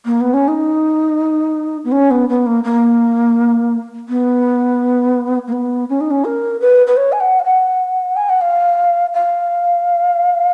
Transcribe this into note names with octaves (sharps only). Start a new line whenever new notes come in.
A#3
B3
C#4
D#4
B3
C#4
B3
B3
A#3
A#3
B3
A#3
B3
C#4
D#4
C#4
A#4
B4
B4
C#5
G#5
F#5
F5
F#5
G#5
F#5
F5
F5